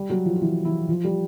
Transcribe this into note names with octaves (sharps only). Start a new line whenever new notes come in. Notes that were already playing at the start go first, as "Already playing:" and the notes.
Already playing: G3 G4
F#3 F#4
F3 F4
F4
E3 E4
E3 E4
F3 F4
G3 G4